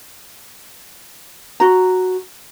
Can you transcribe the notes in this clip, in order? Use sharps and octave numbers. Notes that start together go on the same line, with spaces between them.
F#4 A#5